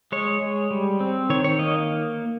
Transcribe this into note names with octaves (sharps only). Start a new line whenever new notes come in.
G#3 C#5
G#3
G3
C4
D#3 C#5
C#5
A#3 D#5